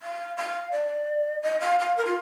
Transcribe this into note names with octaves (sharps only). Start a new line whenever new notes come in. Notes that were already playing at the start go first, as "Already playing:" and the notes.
F5
F5
D5
D#5
F5
F5
A#4
F4